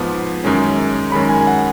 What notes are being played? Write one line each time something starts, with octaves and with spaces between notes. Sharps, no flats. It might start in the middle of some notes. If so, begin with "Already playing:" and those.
Already playing: G#2 F3 B3
F#2 D#3 G#3 C#4
F#2 D#3 G#3 C#4 B5
G#5
F#5